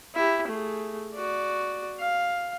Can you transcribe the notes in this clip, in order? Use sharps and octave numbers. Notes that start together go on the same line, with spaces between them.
E4 G4
A3 G#4
F#4 D5
F5